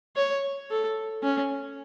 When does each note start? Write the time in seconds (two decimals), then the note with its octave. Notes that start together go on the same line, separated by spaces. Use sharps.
0.16 C#5
0.70 A4
1.23 C#4